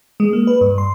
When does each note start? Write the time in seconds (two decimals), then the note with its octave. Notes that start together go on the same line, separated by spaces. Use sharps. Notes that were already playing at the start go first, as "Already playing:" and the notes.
0.20 G#3
0.33 A#3
0.47 B4
0.61 G2
0.78 C6